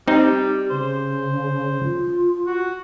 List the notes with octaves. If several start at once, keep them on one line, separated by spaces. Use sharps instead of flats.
G3 C4 D#4 G4
C#3 C5
F4
F#4